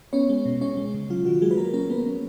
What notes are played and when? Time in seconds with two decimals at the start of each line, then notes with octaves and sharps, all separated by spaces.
0.13 B3 C#4 C#5
0.29 G#3
0.46 B2
0.61 G#3 C#4 C#5
0.77 G#3
0.94 C#3
1.10 F#3 F4
1.25 D#3 F#4
1.42 F#3 G#3 G#4
1.51 B4
1.58 F#3 A#3 A#4
1.74 A#3 C#4 A#4
1.90 F#3 B3 B4
2.06 C#4